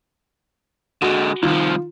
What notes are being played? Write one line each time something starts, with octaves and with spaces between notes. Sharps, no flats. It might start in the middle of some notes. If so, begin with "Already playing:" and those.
D3 G#3 F#4
C2 D#3 F3 F4